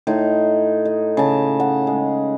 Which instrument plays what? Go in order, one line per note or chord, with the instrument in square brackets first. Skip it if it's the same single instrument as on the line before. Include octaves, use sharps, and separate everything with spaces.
[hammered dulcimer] A2 D#4 C6
D#5
C#3 A5
F#5
G#3